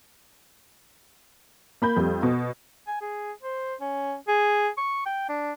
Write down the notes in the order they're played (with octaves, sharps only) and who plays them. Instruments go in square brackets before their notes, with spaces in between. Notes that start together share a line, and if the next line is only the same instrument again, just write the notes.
[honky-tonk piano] A#3 B5 G6
F2 G3
B2
[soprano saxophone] G#5
G#4
C5
C#4
G#4
C#6
G5
D4